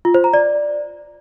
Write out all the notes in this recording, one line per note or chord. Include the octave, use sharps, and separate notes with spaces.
F4
C5
A#5
D5